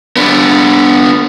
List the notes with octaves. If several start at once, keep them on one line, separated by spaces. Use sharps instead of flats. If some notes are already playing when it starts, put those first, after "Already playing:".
B3 D4